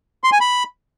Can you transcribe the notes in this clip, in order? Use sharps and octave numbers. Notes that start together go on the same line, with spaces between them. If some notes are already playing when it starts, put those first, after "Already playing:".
C6
G#5
B5